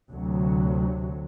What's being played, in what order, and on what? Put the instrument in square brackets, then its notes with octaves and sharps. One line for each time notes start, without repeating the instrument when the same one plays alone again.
[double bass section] D2 C3 F#3